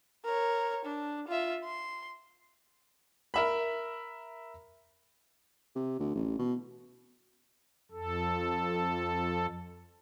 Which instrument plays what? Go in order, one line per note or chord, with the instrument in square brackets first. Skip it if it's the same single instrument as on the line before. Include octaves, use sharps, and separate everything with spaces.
[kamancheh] A#4 C#5
D4
F4 E5
C6
[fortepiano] A#4 E5 B5
[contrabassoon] C3
D2
A1
B2
[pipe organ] F2 A4